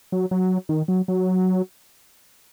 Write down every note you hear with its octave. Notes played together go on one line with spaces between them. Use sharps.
F#3
F#3
D#3
F#3
F#3